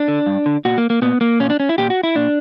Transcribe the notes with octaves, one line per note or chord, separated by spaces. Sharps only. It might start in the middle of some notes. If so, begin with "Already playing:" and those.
Already playing: D4
D3
G2
D3
A#2 F#4
A#3
A#3
A#2 B3
A#3
A#2 C#4
D4
C#4
E4
A#2 G4
F#4
E4
A#2 D4